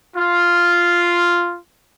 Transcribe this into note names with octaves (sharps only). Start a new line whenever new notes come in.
F4